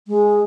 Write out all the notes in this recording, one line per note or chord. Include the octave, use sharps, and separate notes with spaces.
G#3